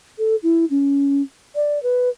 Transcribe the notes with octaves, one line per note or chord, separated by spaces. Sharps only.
A4
E4
C#4
D5
B4